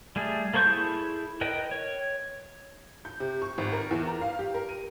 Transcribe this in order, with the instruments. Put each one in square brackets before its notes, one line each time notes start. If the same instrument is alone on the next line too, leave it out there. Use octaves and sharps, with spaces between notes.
[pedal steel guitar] G3 A3 G#4
A#3 A4 C5 C#6 G6
E4 G#4 A4
A#4 B4 D#5 G5
C#5
[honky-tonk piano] G6
C3
C#6
G#1
A#4
E2
A#5
F5
G4
A#4
D#7